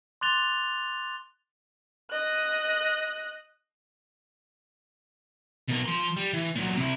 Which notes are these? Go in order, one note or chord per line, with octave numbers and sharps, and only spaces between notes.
C6 D6 F#6 A6 F7 G7
D#5 F#6
B2 A#4
F3 C6
G3
E3
A#2 F#3
C3 E4